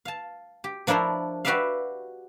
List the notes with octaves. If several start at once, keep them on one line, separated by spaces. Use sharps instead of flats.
F5 A5
G4
F3 D4 E4 A#4 C5 C#5
F#4 G4 B4 D5 E5 F5